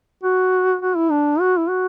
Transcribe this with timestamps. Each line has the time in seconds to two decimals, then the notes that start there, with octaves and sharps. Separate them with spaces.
0.23 F#4
0.82 F#4
0.96 E4
1.11 D4
1.40 F#4
1.57 E4
1.69 F#4